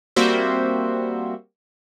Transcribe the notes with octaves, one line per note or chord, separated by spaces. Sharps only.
G3 A#3 C4 F#4 C5 E5